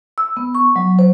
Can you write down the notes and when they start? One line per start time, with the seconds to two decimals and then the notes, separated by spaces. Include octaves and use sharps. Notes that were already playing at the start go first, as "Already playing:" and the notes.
0.18 E6
0.37 B3
0.55 C#6
0.76 F#3
0.99 C5